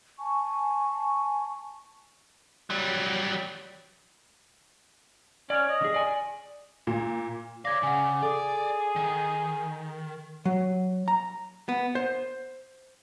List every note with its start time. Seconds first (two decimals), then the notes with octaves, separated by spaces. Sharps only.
0.19 G#5 A5 C#6
2.70 F#3 G3
5.50 C#4 C#5 D5
5.70 D#5
5.81 D3 G#4
5.94 D5 G#5
6.87 A#2
7.65 C#5 D5 F5 G#6 A#6
7.83 C#3 F#5 G#5
8.23 G#4 A4 D5 D6
8.96 D#3
10.45 F#3
11.08 A#5
11.69 B3
11.95 C5